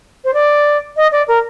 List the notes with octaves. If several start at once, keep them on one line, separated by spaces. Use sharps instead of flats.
C5
D5
D#5
D5
A#4